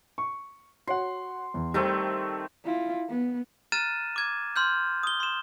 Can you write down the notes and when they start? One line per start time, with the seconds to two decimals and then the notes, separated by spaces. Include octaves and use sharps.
0.18 C#6
0.87 F#4 C#5 F#5 C6
1.54 E2
1.74 D#3 G3 A3 C4
2.65 E4 F4
3.09 B3
3.72 A#5 F6 F#6 A6 D#7 E7
4.16 D6 G#6
4.56 C6 F6 G6
5.03 D#6 G7
5.20 C6 E7